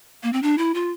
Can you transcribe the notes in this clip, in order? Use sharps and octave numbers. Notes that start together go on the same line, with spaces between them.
A#3
C4
D4
E4
F4